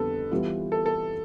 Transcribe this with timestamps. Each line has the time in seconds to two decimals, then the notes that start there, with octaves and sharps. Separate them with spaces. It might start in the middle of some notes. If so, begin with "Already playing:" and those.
Already playing: F2 D3 G3 B3 A4 B4
0.31 E3 G3 B3 F4 B4
0.72 A4
0.86 A4